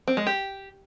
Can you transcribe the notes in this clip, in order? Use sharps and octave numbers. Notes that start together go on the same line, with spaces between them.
C4
G#3
G4